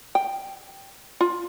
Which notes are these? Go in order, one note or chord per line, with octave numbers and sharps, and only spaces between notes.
G5
F4